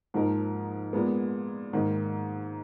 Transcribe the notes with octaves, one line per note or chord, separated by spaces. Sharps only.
G#2 F3 A#3 D#4 A#4
A#2 G#3 B3
G#2 D#3 A#3 D#4